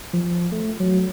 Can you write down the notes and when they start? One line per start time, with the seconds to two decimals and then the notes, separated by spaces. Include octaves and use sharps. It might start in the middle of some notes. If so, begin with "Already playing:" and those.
0.13 F3
0.52 A3
0.80 F#3